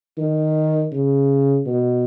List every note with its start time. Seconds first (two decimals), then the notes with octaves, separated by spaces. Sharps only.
0.18 D#3
0.93 C#3
1.66 B2